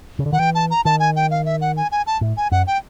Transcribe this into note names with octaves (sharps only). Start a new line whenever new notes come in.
C#3
D3
D#3 F#5
E3 G5
A5
A#5
D#3 A5
G#5
G5
F5
E5
F#5
G#5
G#5
A5
A2
G#5
F#2 F#5
G5